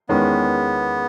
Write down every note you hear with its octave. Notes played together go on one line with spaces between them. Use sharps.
E2 D#3 G#3 B3 C#4